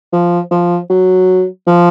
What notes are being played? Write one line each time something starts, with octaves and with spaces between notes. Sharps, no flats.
F3
F3
F#3
F3